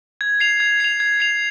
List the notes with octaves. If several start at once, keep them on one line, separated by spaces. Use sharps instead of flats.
G#6
C7 F7
G#6
C7 F7
G#6
C7 F7